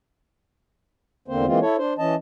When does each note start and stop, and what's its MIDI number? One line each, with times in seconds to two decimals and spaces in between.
1.28 1.46 40
1.28 1.46 50
1.28 1.46 58
1.28 1.46 60
1.28 1.46 72
1.47 1.59 52
1.47 1.59 56
1.47 1.59 58
1.47 1.59 60
1.47 1.59 65
1.62 1.76 64
1.62 1.76 69
1.62 1.76 73
1.78 1.94 62
1.78 1.94 72
1.98 2.15 52
1.98 2.15 61
1.98 2.15 75
1.98 2.15 81